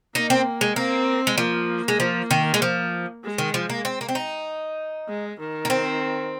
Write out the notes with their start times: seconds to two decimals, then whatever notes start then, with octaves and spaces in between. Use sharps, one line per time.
0.15 A#3 D#4
0.30 C4
0.61 G#3
0.76 A#3 C4
1.27 G#3
1.38 F3 A#3
1.88 G#3
2.00 F3
2.31 D#3
2.54 G#3
2.62 F3
3.24 G#3
3.38 D#3
3.54 F3
3.70 A#3
3.85 C4
4.01 A#3
4.08 C4
4.15 D#4
5.08 G#3
5.39 D#3
5.65 A#3
5.70 C4